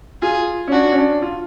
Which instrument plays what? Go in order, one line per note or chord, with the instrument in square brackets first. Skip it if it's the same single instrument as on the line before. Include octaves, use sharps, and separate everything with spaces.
[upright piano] F4 [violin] G#4
[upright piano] C#4
[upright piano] D4 [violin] F#4
[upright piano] C#4
D4
F4